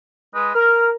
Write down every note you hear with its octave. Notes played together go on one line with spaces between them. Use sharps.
G#3 B4 D#5
A#4 F6